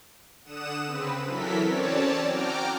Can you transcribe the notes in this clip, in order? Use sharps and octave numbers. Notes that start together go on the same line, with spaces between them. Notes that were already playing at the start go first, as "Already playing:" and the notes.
D3 F#5 D#6 E7
C#3 C4 B4
E3 F#3 A4 A#4 B6
C4 C#4 C#5 D5 A5
F#4 G5 A#5 D6 F6